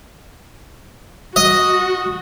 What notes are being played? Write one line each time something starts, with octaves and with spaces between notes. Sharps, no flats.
F#4 D#5